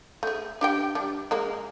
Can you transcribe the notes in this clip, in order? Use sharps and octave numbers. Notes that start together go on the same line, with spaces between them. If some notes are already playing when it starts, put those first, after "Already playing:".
A3 G#4
D4 G4 G5
G3 D4
G#3 A#3